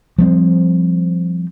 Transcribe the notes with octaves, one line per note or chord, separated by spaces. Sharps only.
F3 G3 C4